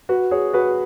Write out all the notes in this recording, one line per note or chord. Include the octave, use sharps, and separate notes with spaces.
F#4 B4
G#4 C#5
F#4 B4